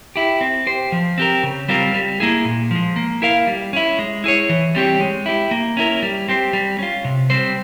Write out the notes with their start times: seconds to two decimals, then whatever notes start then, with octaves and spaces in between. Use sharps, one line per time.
0.16 E4 G4
0.41 C4
0.67 G4 C5
0.92 F3
1.18 C4 G4 A#4
1.43 C#3
1.69 G3 C4 F4 A#4
1.94 G3
2.20 A#3 E4 G#4
2.45 A#2
2.71 F3 G#3
2.96 A#3
3.22 E4 A#4 F5
3.47 G3
3.73 C#4 E4
3.99 G#3
4.24 E4 G#4 C#5
4.49 E3
4.75 G3 C4 G4 C#5
5.00 G#3
5.26 E4 G4
5.51 A#3
5.77 C#4 E4 A#4
6.02 G3
6.28 C4 G4 C5
6.53 G3
6.79 C#4 F4
7.05 C3
7.30 G3 C4 G4 C5